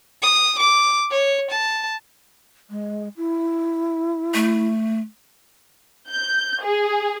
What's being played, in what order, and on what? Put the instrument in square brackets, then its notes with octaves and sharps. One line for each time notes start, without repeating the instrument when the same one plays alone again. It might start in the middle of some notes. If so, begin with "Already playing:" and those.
[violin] D#6
D6
C#5
A5
[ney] G#3
E4
[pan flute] A3
[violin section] G6
G#4